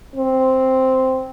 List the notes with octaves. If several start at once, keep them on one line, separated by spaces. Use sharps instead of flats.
C4